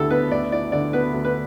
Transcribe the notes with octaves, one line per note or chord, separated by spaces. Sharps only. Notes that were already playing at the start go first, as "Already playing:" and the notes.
Already playing: D2 D3 B3 E4 G4 A4
B3 B4
D2 D5
E4 D5
D3 D5
B3 B4
D2
B4